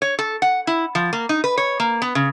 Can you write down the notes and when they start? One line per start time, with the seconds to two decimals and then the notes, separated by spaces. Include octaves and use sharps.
0.02 C#5
0.19 A4
0.42 F#5
0.67 E4
0.95 F3
1.13 A#3
1.29 D#4
1.44 B4
1.58 C#5
1.80 A#3
2.02 B3
2.15 C#3